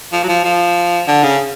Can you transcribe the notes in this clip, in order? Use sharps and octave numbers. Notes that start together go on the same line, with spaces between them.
F3
F#3
F3
F3
D3
C#3